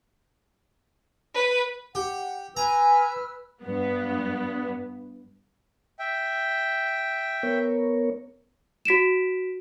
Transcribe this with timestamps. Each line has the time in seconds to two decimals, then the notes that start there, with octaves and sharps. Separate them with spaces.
1.35 B4
1.95 G4 F#5
2.57 B4 G#5 A#5 E6 F6
3.64 G2 B3
5.99 E5 G5
7.43 B3 A#4 C#5
8.85 F#4 B6 D7 E7